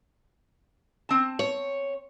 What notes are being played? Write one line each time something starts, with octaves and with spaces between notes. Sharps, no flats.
C4 A5
C#5